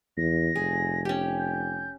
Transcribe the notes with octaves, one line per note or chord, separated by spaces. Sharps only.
E2 A#6
F1 G#4
C#4 G4
G6